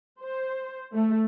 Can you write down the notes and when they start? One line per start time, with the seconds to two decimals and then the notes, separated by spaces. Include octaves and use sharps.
0.21 C5
0.94 A3